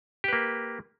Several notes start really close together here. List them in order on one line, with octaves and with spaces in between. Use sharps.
G4 B4 A#3